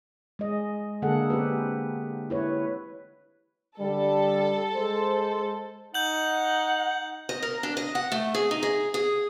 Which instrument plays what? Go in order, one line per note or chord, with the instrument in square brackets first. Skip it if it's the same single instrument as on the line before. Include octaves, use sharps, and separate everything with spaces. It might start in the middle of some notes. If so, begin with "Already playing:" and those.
[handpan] G#3 D#5
D3 A#3 G#4 A4 F#5
C4 G4 B4
E4 B4 C#5
[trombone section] D3 G3 [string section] A4
[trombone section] G#3 C5
[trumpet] D#4 [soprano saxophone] F#5 [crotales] G6 F#7
[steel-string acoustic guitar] D#5
A#4
D4
D#5
F#5
A3
G#4
D#4
G#4
G#4